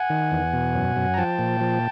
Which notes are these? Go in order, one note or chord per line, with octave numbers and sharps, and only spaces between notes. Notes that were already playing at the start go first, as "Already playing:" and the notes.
Already playing: F#5 G#5
D#3
E2
B2
F#2
F#2
A#5
F3 G5 A5
A#2
F3